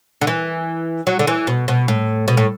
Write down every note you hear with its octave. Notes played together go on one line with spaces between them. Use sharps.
D3
E3
F#3
D3
E3
B2
B2
A2
B2
A2